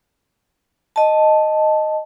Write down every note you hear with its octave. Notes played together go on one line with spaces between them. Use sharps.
D#5 A5